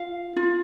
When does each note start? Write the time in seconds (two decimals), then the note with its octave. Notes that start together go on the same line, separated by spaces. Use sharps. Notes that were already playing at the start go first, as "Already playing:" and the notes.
Already playing: F4 F5
0.36 F4